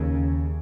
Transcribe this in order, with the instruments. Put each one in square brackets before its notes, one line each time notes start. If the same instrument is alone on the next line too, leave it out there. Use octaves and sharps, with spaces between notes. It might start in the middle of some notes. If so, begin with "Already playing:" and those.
Already playing: [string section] D#2 C#3